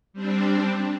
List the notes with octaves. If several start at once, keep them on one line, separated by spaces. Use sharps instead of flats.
G3 C4 D4